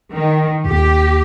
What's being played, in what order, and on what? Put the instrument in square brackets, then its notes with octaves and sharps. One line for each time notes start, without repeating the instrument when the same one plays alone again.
[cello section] D#3
[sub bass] D#2 [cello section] G4